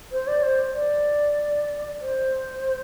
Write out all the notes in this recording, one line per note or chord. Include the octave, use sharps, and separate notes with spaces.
C5
D5
C5
D5
C5